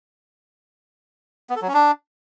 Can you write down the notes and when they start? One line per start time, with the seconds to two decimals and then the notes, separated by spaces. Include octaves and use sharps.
1.50 B3
1.56 A4
1.62 F#3
1.68 C#4
1.74 D4